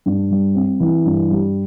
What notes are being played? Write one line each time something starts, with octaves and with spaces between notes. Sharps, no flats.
G2
G3
C4
E3
G2
G3